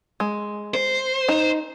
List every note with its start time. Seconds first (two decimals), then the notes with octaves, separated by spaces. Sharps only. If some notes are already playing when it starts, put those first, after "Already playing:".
0.20 G#3
0.74 C5
1.28 D#4